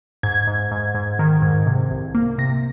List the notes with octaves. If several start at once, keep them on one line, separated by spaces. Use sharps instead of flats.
G#2 G#6
G#2
G#2
G#2
D#3
G#2
C3
C2
A#3
C3 A#6